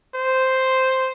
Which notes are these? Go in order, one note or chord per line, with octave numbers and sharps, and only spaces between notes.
C5